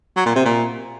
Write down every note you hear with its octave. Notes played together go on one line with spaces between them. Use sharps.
F#3
A#2
C3
A#2